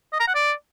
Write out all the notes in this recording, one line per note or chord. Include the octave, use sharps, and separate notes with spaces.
D#5
A#5
F#5
D5